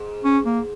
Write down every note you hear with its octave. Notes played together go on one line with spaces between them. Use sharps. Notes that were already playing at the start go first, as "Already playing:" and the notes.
Already playing: G#2
C#4
A#3